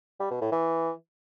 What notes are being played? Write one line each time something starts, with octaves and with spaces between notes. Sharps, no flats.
G3
B2
A2
E3